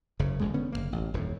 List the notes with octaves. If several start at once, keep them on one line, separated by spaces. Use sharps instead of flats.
F#1 F#2 C#3
D#1 C#2 F#2 G#3
D3 B3 C#4
F#1 F2 A#3
A1
D#1 F#2 A2